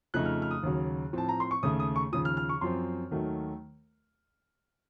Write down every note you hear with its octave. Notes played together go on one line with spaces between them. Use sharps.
F2 C#3 F3 A3 D#4 F#6
F6
F6
D#6
D#2 C#3 F#3
A2 F3 C4 A5
A#5
C6
C#6
D#2 C#3 A3 D#6
D#6
C#6
D#2 C#3 F3 D#6
F6
F6
C#6
F#2 F3 C4 C6
D#2 D#3 F#3 A3